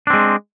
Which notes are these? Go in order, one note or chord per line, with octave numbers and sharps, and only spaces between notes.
G#3 C4 D4